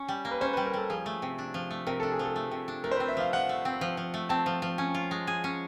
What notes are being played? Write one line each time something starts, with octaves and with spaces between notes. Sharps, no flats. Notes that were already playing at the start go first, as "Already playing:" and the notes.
Already playing: C#4
G3
A#3
B4
C#4 C5
G3 B4
A#4
G3 A4
F3 G#4
A3
C3
D4
F3
A3
C3 A#4
D4 A4
G#4
F3
A4
A3
C3
D4
A3 A#4
C5
C4 B4
E5
F3 F5
F3 F#5
A3
C4
F3
F3
A3
C4 A5
F3
F3
C#4
F4
G#3
G#4
C#4